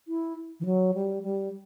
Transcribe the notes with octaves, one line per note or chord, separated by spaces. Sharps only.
E4
E3
F#3
G3
G3